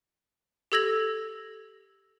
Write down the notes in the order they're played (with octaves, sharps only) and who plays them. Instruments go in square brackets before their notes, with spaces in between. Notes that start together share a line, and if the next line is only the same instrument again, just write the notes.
[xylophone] G4 A4 E6 G#6 A#6 F#7